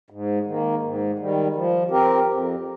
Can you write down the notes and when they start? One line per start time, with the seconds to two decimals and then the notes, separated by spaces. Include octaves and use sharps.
0.10 G#2
0.46 D#3 A#3
0.82 G#2
1.19 D#3 G3
1.55 F3
1.91 C4 G4 A#4
2.27 F2